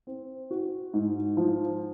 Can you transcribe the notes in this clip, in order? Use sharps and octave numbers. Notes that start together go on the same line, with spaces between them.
C4
F#4
G#2
F3